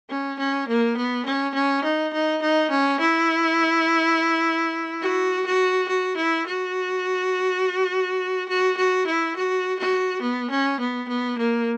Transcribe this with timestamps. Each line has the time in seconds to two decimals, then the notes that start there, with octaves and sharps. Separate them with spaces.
0.10 C#4
0.39 C#4
0.68 A#3
0.97 B3
1.26 C#4
1.54 C#4
1.84 D#4
2.13 D#4
2.42 D#4
2.70 C#4
3.00 E4
5.02 F#4
5.46 F#4
5.88 F#4
6.17 E4
6.46 F#4
8.48 F#4
8.77 F#4
9.07 E4
9.36 F#4
9.79 F#4
10.21 B3
10.50 C#4
10.80 B3
11.08 B3
11.38 A#3